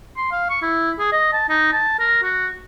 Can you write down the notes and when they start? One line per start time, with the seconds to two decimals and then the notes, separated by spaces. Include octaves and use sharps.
0.17 C6
0.31 F5
0.50 C#6
0.62 E4
0.99 G#4
1.12 D#5
1.33 A5
1.49 D#4
1.73 A5
1.99 A#4
2.22 F#4